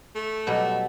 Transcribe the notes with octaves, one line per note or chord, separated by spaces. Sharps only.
A3
B2 F#3 G3